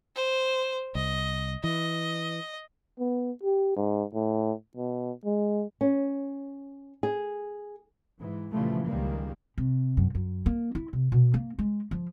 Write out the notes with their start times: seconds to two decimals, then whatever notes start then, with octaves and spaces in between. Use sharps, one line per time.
0.16 C5
0.95 C2 D#5
1.64 E3 D#5
2.99 B3
3.43 G4
3.76 G#2
4.14 A2
4.77 B2
5.25 G#3
5.81 C#4
7.03 G#4
8.19 G#2 E3
8.52 A#2 C#3 E3 F3 G3 A3
8.86 C#2 D#3 G3 G#3 A#3
9.58 C3
9.97 F#2
10.15 F#2
10.46 A#3
10.75 E4
10.93 C3
11.12 B2
11.34 A#3
11.59 G#3
11.91 F3